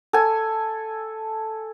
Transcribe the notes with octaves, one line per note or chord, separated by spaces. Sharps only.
A4 G#5